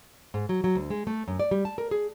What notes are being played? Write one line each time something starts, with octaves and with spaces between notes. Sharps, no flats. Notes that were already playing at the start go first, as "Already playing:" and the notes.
G#2
F#3
F#3
D2
G#3
A3
F#2
D5
G3
A5
A#4
G#4